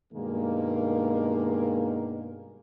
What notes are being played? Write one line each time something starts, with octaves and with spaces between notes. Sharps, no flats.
G2 B2 D#3 G#3 A#3